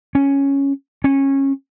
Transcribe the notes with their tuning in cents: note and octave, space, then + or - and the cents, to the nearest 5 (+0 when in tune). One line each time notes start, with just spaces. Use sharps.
C#4 +0
C#4 -20